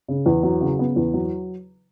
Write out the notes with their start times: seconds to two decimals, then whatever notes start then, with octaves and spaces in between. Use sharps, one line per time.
0.08 C#3
0.26 E2
0.43 F#3
0.61 C#3
0.79 B3
0.96 E2
1.14 F#3